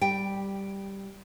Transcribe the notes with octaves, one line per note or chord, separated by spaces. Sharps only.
G3 G5